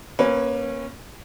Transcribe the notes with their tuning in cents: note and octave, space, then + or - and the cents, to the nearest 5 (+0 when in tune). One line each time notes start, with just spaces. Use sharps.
A#3 +20 C#4 -15 B4 +0